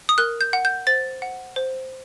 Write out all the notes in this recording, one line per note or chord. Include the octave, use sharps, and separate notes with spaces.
D#6
A#4 F#6
G6
F#5
G6
C5 A6
F#5
C5